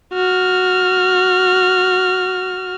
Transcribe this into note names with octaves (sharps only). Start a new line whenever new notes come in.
F#4 F6